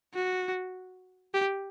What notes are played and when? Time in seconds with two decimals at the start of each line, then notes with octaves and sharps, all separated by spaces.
0.14 F#4
1.34 G4